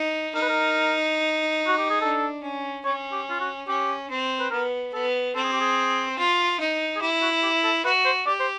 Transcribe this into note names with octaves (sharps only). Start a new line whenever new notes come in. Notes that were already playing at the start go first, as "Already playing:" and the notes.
Already playing: D#4
D#4 A#4
B4
A#4
F#4
G4
G#4
D4 A4
C#4
C#4 C#5
G4
F4
F#4
C#4 G4
C4
B4
B3 A#4
B3 A4
C4 A4
G#4
G4
G#4
F4
D#4
G#4
E4 G4
F#4
G4
A4
F#4 B4
C5
G4 D5
C5